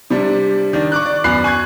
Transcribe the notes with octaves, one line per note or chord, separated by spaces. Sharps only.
C3 G3 D4
D#3 D4
C#6 D6 F#6
D5
F#2 B3 B5 F#6 C7
G#5 C#6 F#6 G#6